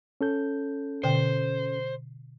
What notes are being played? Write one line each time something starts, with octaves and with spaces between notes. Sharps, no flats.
C#4 A4 G6
B2 D3 C5 G5